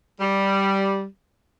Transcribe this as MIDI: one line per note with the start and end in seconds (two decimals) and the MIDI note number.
0.21 1.05 55